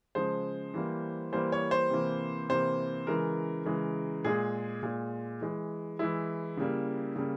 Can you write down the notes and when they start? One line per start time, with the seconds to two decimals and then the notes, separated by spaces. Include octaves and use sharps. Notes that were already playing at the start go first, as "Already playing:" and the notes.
0.15 C#3 F3 G#3 C5
0.74 E3 G3 A#3
1.32 E3 G3 A#3 C5
1.52 C#5
1.71 C5
1.90 C3 E3 A#3
2.49 C3 E3 A#3 C5
3.07 C#3 E3 G#3 A#4
3.66 C#3 E3 G#3
4.24 A#2 G#3 G#4
4.83 A#2 G#3
5.41 E3 G#3
5.99 E3 G#3 E4
6.57 C#3 G3 A#3
7.16 C#3 G3 A#3